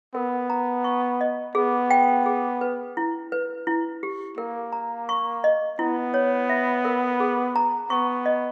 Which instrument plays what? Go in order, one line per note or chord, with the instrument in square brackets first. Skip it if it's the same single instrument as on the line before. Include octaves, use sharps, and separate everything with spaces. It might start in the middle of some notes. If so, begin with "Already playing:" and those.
[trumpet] B3 [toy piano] A#4
[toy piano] A#5
C#6
D#5
[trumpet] B3 [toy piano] G#4
[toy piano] G5
G#4
B4
E4
B4
E4
G4
[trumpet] A#3 [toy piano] A#4
[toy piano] A#5
C#6
D#5
[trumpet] B3 [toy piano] E4
[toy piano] C#5
E5
A#4
G#4
A#5
[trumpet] B3 [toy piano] C#6
[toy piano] D#5